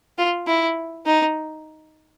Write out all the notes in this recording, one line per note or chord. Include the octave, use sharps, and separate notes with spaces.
F4
E4
D#4